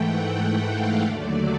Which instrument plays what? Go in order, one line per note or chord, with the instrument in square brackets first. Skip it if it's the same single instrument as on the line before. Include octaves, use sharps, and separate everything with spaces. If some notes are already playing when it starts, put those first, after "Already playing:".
Already playing: [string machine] G#2 E3 A3 F#5 G5
F#5
F5
D#2 D3 F#3 A3 D5